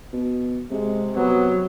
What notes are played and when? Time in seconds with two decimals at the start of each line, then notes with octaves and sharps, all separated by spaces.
0.13 B2
0.71 C3 G#3
1.16 F#3 B3